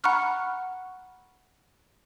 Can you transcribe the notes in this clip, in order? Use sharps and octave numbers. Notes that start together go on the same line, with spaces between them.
F#5 A#5 B5 C#6 F6 F#6